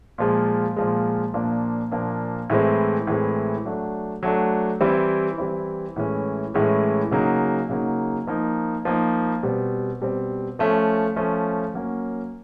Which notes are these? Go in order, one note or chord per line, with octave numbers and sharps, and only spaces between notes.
A#2 F3 G#3
A#2 F3 G#3
A#2 F3 A#3 D4
A#2 F3 A#3 D4
A2 E3 G#3 C4
A2 E3 G#3 C4
F#3 A3 D4
F#3 A3 D4
E3 G3 C4 E4
E3 G3 C4 E4
A2 E3 G#3 C#4
A2 E3 G#3 C#4
C#3 F#3 A#3 D#4
C#3 F#3 A#3 D#4
F3 A#3 D#4
F3 A#3 D#4
B2 G3 C4
B2 G3 C4
F3 A3 C#4
F3 A3 C#4
F#3 A#3 C#4